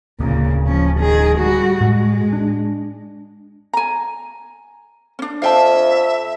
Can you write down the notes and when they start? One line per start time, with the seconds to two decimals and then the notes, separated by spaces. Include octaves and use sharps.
0.20 D1 D2 A#2 C#3 A#3
0.67 F3 C#4
1.00 D#3 G#4
1.39 G3 F#4
1.81 A2 G#3
2.33 D4
3.73 G#5 A#5
5.19 C#4 D4
5.42 F2 E5 F5 G5 A5